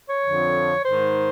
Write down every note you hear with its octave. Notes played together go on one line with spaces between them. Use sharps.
C#5
F2 D3 F3
G#2 D#3 C5